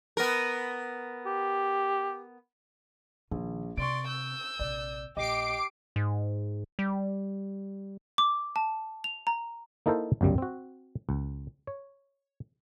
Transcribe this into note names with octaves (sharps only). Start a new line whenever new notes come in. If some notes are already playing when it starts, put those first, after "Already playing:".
B3 A#4
G4
A#1 D#3
C3 D5 C6 C#6 D7
E6 G6
A#1 C3 D5
A#1 G4 D#5 D6 C7 D7
G#2
G3
D6
A5
F7
A#5
A#3 D#4 E4 A4 A#4 C5
G1 C#2 F#2 G3
C4 F#4
C#2
C#5